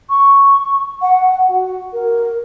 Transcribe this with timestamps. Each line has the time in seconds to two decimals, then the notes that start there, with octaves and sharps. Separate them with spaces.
0.09 C#6
1.02 F#5
1.49 F#4
1.93 A#4